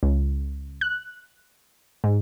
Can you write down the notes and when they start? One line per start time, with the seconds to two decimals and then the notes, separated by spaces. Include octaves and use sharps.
0.03 C#2
0.81 F#6
2.04 G#2